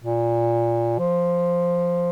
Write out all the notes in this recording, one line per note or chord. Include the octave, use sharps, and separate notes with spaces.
A#2
F3